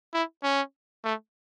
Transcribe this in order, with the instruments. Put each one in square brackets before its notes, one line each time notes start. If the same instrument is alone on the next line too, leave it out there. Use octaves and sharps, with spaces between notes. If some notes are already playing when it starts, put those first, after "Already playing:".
[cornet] E4
C#4
A3